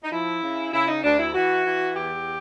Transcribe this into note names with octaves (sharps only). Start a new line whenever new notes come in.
D#4
F3 E4
C#3
C#3 E4
D#4
D2 D4
E4
E3 F#4
E3
E2 G4